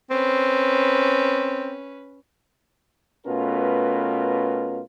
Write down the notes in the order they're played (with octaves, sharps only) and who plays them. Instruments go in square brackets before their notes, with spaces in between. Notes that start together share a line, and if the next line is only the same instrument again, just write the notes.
[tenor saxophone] C4 [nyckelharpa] C#4 B4
[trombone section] B2 A3 C#4 F4 A#4 B4